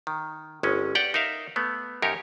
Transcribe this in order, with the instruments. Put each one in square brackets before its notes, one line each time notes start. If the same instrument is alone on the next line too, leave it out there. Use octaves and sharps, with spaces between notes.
[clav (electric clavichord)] D#3
G1 G#3 C#4
G4 D5 F#5 G5
D#4 A#4 E5 F5
A3 B3
F#2 D#4 G4 A#4 C#5